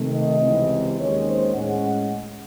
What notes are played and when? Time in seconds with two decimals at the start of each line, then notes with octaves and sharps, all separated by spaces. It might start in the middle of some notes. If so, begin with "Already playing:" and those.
Already playing: C3 D#3 A3
0.12 D#5
0.40 C#2 C3 E3 C4
0.97 D#2 D#3 G#3 C#4 C#5
1.25 C5
1.54 A2 G#3 C#4 F#5